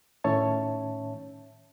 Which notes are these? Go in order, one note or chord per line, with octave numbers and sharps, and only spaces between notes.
A2 D#3 C#4 C#5 E5 A5